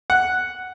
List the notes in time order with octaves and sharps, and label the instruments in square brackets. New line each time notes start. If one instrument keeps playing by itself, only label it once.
[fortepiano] F#5